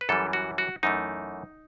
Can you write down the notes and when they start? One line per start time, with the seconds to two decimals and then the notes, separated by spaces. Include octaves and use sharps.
0.01 B4
0.09 F#2 E3 G3 A4
0.33 F#4
0.58 F#4
0.83 F#2 E3 A3 D#4